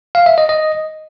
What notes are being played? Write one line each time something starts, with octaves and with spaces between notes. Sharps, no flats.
F5
E5
D#5
D#5